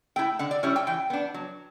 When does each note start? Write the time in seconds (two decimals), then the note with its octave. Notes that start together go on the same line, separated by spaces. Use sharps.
0.16 A3 E4 G5
0.39 D3 F#5
0.51 D5
0.63 G3 C#4 E4 C#5
0.76 G5
0.87 E3 G5
1.10 B3 D4
1.34 F#3